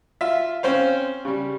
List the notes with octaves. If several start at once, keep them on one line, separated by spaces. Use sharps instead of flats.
F4 E5
C4 C#4 C5 F5
C#3 G3